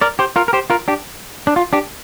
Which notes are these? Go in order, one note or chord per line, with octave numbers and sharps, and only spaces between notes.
A#4 D5
G4 C5
F4 A#4
A#4
G4 C5
F4 A#4
D4 G4
D4
F4
D4 G4